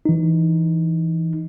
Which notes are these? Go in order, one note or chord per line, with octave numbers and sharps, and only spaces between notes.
E3 D#4